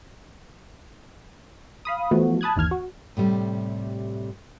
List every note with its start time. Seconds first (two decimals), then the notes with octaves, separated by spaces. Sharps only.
1.85 F5 B5 D#6
2.11 E3 F3 A3 B3 F#4
2.41 A5 B5 D#6 F#6 G#6
2.56 G1 D#2 E3 F6 G#6
2.71 F#4
3.17 A2 C3 G3